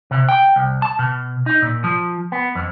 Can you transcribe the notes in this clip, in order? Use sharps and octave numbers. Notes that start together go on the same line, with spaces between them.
C3
G5
C2
A5
B2
D#4
A#2
F3
B3
F2